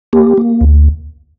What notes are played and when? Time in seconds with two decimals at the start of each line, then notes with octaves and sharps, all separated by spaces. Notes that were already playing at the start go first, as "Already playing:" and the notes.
0.13 A#3 G4
0.37 A#3
0.61 D2